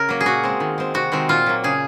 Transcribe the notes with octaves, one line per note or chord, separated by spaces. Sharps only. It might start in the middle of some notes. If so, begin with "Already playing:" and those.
Already playing: C#3 A#4
F#3 A#3
G#4
A#2 F#4
G#3 C4
D#3
G#3 C4
C3 F#4
D#3 G#3 C4
A#2 F4
F#3 A#3
C#3 G#4